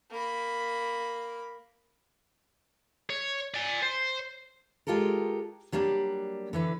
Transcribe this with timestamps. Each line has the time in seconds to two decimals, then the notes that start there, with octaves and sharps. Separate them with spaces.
0.11 A#3 B5
3.10 C#5
3.54 D5 G#5
3.82 C5
4.87 G#3 F4 G4 A4 A#4
5.72 F#3 G3 A#3 D4
6.53 D3 E3 B4